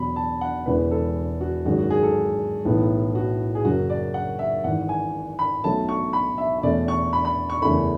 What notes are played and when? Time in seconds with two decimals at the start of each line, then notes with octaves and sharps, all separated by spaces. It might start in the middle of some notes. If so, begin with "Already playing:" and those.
Already playing: E2 B2 F#3 B5
0.16 A5
0.41 F#5
0.66 E1 E2 C#3 E3 G#3 B4
0.91 A4
1.41 F#4
1.65 G#1 F#2 C#3 G#3 F#4
1.79 F#4
1.90 G#4
2.03 A4
2.65 B1 A2 E3 B3
3.15 F#4
3.55 G#4
3.65 F#1 F#2 C#3 F#3 C#4 F#4
3.90 D5
4.14 F#5
4.39 E5
4.64 G#1 G#2 E3 F#5
4.89 G#5
5.39 B5
5.64 B1 B2 F#3 A3 C#4 A5
5.89 C#6
6.13 B5
6.38 E5
6.58 E5
6.63 E2 B2 A3 C#4 D5
6.88 C#6
7.13 B5
7.25 B5
7.50 C#6
7.62 F#1 E2 C#3 E3 A3 B5